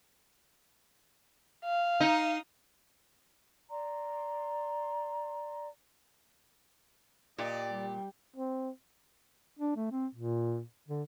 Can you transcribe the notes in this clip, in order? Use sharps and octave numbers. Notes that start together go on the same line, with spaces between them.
F5
D#4
D5 A#5 C6
A#2 G4 D5 D#5
G3
C4
D4
A3
C4
A#2
D3